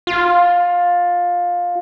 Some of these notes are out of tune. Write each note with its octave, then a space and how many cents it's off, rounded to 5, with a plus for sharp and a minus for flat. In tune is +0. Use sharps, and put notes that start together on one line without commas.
F4 +15